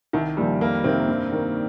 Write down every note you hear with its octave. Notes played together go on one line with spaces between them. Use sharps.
C2 D#3
A#2 F3 G3
F2 A#3
C3 D#3 A#3 C4
G2
D#3 A#3